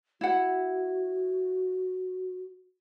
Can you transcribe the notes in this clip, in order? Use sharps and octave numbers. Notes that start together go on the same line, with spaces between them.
E4 F#4 F#5